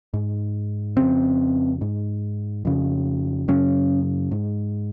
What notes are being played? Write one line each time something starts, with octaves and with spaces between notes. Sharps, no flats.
G#2
F2 C#3 C4
G#2
F2 C#3
F#2 C#3 C#4
G#2